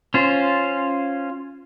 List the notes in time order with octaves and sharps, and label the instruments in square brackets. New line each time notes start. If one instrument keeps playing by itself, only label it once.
[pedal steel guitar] C#4 F4 C5